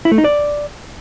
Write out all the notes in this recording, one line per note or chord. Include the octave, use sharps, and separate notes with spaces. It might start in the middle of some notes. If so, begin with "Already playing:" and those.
E4
A3
D#4
D5